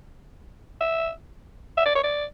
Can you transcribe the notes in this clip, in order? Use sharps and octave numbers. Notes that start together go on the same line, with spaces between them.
E5
E5
D5
C#5
D5